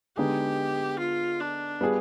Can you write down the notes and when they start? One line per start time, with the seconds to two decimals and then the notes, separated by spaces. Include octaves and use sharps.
0.17 D3 G#3 B3 D#4 G4 G#4
0.99 F4
1.40 D4
1.81 G3 B3 F4 G#4